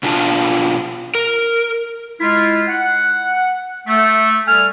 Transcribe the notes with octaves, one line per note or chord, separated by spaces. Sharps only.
B2 D4 F4 A5
A#4
G#3 E4 F4
F#5
A3
G3 A4 G#5 F6